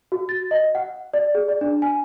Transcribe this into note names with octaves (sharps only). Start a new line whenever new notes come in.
F#4
A6
D#5
F#5
D5
G#4
D5
D4
G#5